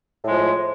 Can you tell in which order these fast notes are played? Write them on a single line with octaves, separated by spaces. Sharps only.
A2 G#3 F3